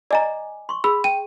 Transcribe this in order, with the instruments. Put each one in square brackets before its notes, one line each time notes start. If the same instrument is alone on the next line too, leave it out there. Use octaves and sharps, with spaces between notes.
[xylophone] D5 D#5 A#5 [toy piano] G#5 D6
[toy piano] C6 C#6
[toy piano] G#4 [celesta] B5 [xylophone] E6
[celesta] G5 [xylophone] D#7